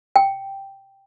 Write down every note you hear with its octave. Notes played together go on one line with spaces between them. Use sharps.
G5